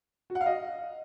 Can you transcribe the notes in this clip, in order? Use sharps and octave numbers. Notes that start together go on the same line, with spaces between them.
F#4
F#5
F5
D#5